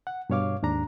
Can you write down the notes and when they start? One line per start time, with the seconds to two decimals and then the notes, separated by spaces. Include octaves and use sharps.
0.07 F#5
0.30 G2 B2 C#5 F5 D6
0.63 D#2 G#2 D4 A#5